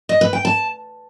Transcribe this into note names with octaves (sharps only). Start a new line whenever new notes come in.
D#5
B4
G5
A5